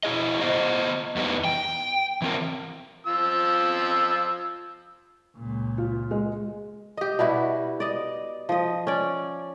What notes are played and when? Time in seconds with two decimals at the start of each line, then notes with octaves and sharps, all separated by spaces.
0.03 E4 G#4 D#5
0.41 B3 C5 D#5
1.16 E2 G3 B3 D#4
1.45 G5
2.22 E3 C4 A#4
3.07 F3 F4 E6
5.36 C#2 A#2
5.78 F4
6.11 G#3
6.97 G4 D#5
7.19 B2 G3 E4 F#4
7.80 D5 D#5
8.49 F3 D#5
8.87 C#4 D5